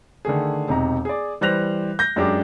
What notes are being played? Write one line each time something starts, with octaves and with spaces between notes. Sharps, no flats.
D3 D#3 A3 G#4
E1 C3 D#4 A#5
G#4 D5
E3 G3 C5 F#6 A#6 F7
G6 A#6
F#2 G#3 D4 G4